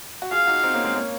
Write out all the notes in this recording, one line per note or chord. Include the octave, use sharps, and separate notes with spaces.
F#4
F4 G#4 F5
D#4 F#4
C4 D#4
A#3 C#4
G#3 C4
A#3 C#4